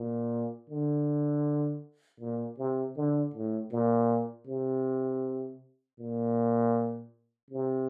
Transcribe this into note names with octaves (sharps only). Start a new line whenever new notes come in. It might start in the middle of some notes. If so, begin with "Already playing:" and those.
Already playing: A#2
D3
A#2
C3
D3
A2
A#2
C3
A#2
C3